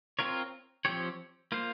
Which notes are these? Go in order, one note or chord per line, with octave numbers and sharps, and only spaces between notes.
C4 F4 A#4 C#5
F3 C4 G4 C#5
A#3 F4 C5